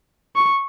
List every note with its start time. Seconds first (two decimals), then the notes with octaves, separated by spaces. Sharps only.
0.36 C#6